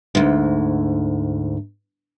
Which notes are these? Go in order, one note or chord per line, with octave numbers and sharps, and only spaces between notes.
D2 G#2